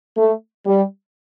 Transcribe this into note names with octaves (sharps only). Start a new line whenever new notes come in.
A3
G3